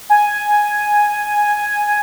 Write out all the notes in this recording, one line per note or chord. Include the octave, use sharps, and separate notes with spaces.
G#5